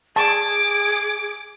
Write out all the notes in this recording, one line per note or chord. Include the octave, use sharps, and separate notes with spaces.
G#4 A5 D6